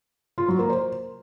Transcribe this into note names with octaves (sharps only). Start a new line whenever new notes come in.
F4
F#3
A#3
C5